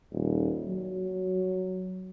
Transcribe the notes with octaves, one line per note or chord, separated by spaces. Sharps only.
D#1
F#3